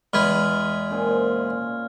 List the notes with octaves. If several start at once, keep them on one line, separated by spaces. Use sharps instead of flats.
E2 G#3 B4 F6 G#6
A#2 C#4 C5